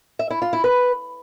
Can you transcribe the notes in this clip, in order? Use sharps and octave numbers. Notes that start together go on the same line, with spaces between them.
E5
E4
F4
E4
B4